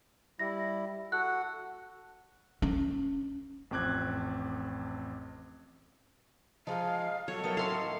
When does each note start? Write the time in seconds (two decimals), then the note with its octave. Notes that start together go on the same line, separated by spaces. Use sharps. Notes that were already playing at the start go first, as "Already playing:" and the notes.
0.39 G3 E4 A#6
1.12 F#4 A4 F#5 F#6
2.62 C#4
3.71 A1 F2 C4 D6 F#6 G#6
6.67 F3 G#3 D#4 F5
7.28 F#3 A4 C#5
7.44 F#3 B3 A#4 E5 G5
7.57 A2 D#3 C#4 F5 C6